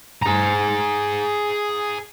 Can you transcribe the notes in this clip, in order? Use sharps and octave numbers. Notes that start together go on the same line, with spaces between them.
G#4 A#5